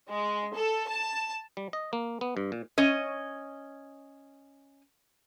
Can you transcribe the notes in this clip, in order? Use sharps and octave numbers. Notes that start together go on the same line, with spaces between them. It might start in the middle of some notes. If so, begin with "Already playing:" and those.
G#3
A4
A5
G3
D#5
A#3
B3
G2
A#2
C#4 D#5